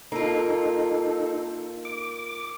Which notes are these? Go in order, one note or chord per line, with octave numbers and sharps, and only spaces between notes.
A#3 D#4 F4 A4
D6